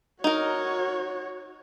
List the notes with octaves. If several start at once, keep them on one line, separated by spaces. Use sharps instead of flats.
D#4 F#4 A#4 C#5